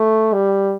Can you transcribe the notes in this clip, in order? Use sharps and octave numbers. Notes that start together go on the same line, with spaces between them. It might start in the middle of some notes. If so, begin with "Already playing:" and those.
Already playing: A3
G3